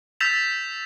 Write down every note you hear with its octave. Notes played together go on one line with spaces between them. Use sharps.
E6 G6 A6 B6 E7 F7